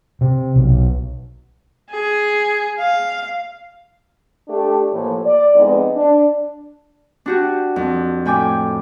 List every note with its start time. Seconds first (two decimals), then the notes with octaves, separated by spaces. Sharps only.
0.21 C3
0.56 B1
1.91 G#4
2.78 F5
4.48 A3 D4 G4
4.93 A2 E3 F3 A#3
5.25 D5
5.54 F2 G#3 B3 D#4
5.94 D4
7.26 D4 F#4 G4
7.76 F2
8.26 A2 G5 G#5 D6